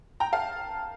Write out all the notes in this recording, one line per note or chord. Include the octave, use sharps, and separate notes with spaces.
G5 A#5
F5 A5